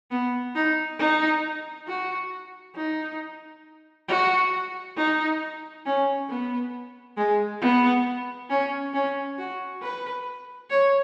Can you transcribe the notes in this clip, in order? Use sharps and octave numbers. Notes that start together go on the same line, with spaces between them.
B3
D#4
D#4
F#4
D#4
F#4
D#4
C#4
B3
G#3
B3
C#4
C#4
F#4
B4
C#5